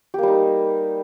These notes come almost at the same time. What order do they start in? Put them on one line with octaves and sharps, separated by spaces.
G4 A#3 G3 D#4